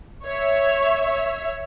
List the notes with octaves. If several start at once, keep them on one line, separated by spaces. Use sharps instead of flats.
C#5 E5